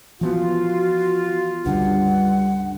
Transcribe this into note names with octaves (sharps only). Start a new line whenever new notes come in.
E3 F3 B3 F4 F#4
C#2 G2 D3 F#5